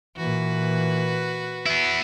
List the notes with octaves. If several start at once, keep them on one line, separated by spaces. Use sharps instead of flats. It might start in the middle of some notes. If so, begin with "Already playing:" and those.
A#2 E3 F#4 B4
B3 E4